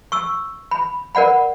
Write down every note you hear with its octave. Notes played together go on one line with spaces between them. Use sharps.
C#6 E6
B5
A#4 D5 F#5 B5